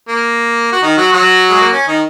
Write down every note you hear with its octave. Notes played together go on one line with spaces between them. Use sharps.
A#3
F#4
D#3 D#4
F#3 F#4
F#3 F#4
G#3
A#3
C#4
D#3 D#4